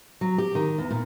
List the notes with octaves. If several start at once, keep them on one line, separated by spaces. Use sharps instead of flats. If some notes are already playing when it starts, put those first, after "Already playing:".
F#3
G4
D#3
E2
A#2